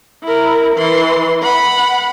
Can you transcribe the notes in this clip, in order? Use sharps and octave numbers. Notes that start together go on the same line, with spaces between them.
E4 A#4
E3 C6
F#5 B5